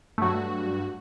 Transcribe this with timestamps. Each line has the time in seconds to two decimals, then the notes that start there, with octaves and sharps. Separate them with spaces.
0.18 G2 F#3 A3 F#4